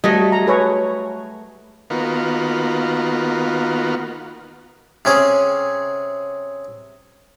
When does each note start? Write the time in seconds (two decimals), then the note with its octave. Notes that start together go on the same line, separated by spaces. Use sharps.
0.04 F#3 G3 A3 D#5
0.32 A#5
0.47 G#4 B4 C#5
1.90 D#3 A#3 B3 F4 F#4
5.05 C3 C#4 G#4